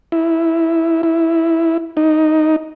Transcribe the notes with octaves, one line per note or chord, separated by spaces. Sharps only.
E4
E4
D#4